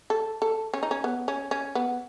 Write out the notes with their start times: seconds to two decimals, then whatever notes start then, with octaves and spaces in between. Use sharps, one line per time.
0.10 A4
0.42 A4
0.74 C#4
0.83 D#4
0.91 C#4
1.04 B3
1.28 C#4
1.51 C#4
1.75 B3